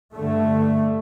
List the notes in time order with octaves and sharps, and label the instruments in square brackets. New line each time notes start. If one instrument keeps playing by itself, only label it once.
[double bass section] G2 D3 A3